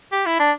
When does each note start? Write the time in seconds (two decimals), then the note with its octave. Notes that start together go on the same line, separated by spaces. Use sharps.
0.12 G4
0.26 E4
0.39 D4